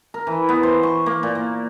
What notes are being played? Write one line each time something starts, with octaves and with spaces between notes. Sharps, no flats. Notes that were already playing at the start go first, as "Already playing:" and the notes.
A#4
E3
B3
C5
C#6
A#3
A#2
A#3